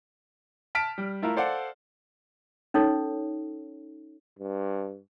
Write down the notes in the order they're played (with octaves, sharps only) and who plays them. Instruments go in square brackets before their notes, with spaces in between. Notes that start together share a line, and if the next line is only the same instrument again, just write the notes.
[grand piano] A5 F6 B6 D7
G3
A3 E4 F4 A#4
A4 C5 D5 F5 F#5
[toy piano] C#4 D#4 A4 C#5
[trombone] G2